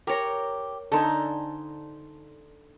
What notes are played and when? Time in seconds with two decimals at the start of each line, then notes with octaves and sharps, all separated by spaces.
0.07 G4 A#4 C#5 A#5
0.92 D3 D#4 A4 C5 G#5